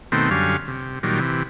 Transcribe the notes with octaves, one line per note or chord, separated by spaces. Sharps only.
B2 D#3 A3 C4
F#2 D3 G3 C#4 F5
C3
A#2 D#3 F#3 G3
C3 E3